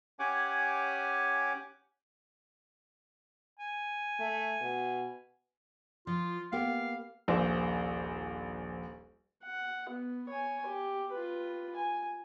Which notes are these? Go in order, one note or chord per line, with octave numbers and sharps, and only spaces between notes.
C#4 G4 C#5 F#5 G#5 D6
G#5
A3
B2
F3 F4
A#3 B3 G4 F5
D#1 A#1 C5
F#5
B3
C#5 G#5
G4
F4 B4
G#5